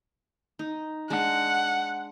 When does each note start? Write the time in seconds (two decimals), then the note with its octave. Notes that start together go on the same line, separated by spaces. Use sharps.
0.59 D#4
1.10 G#3 D4 F#5